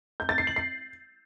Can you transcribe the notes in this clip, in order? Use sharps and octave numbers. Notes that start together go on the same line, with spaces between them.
G6
A6
C7
F#7
C7